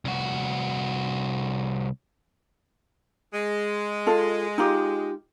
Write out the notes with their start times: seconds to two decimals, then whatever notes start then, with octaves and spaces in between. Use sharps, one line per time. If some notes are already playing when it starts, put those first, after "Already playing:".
0.05 C2 F#4
3.33 G#3
4.07 F4 A4
4.58 D#4 F4 G4